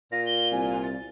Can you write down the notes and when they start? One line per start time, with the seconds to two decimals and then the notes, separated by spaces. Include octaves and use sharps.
0.12 A#2 F4 A#6
0.26 G7
0.52 C2 G#5
0.83 A6